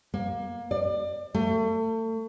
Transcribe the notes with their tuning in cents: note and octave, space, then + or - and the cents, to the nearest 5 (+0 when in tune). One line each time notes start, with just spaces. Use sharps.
A#3 +20
D5 +30
A3 +35